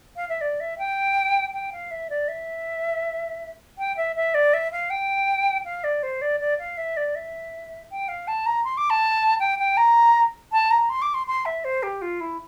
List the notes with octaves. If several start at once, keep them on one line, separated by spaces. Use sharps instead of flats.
F5
E5
D5
E5
G5
G5
F5
E5
D5
E5
G5
E5
E5
D5
E5
F5
G5
F5
D5
C5
D5
D5
F5
E5
D5
E5
G5
F5
A5
A#5
C6
D6
A5
G5
G5
A#5
A5
A#5
C6
D6
C6
C6
E5
C5
G4
F4
E4